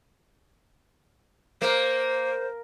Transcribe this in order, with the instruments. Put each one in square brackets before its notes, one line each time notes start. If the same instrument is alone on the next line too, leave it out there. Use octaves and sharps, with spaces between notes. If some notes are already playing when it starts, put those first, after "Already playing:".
[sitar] A#3 [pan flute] C5